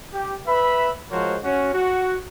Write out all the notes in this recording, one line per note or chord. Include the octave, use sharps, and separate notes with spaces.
G4
B4 E5 B5
F3 G#3 F#4 A#4 C5 C#5
C#4 F#4
F#4